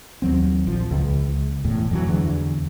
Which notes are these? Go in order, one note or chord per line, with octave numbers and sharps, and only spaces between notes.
D#2 F#3 C4
A#1 F3
C#2
E1 E2 A2
F2 E3 F#3
E2 D3